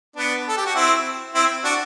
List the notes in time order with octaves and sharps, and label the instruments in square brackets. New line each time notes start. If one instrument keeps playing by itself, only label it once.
[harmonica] B3 D4
A4
G4
F#4
C4 E4
C4 E4
D4 F#4